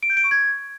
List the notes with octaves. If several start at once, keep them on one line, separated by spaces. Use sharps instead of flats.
D7
G6
D7
C#6
G#6